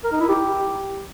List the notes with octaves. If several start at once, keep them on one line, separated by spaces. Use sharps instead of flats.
A#4
D#4
E4
G4